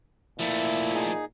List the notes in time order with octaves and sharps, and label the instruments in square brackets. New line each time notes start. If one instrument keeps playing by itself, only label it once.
[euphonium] A#2 [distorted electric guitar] F3 A3 [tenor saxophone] E4
[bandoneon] D#4 G#4